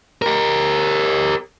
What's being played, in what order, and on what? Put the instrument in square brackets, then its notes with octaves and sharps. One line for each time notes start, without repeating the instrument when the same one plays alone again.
[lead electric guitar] G4 A#4